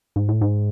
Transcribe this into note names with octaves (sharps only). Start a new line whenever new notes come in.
G#2
A2
G#2